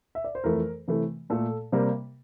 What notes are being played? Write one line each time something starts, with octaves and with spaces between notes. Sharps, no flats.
E5
D5
C5
F2 E3 A3 A#4
C3 E3 A3
A#2 A3 A4
C3 G3 A#3